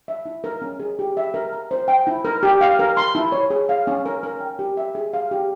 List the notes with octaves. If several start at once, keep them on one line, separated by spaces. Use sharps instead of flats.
E5
E4
A#4
C#4
G#4
G4
E5
A#4
A#5
C5
G5
E4
A#4
G4
F5
A#4
C6
E4
C#5
G#4
F5
C#4
A#4
A#4
G5
G4
E5
G#4
F5
G4